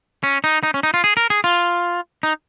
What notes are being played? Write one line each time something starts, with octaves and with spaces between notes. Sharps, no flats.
C#4
D#4
D#4
C#4
D#4
F4
G#4
A#4
G#4
F4
D#4